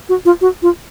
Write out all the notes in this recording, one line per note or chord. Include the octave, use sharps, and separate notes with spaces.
F#4
F4
F#4
F4